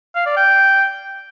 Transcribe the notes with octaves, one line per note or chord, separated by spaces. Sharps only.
F5
D5
G5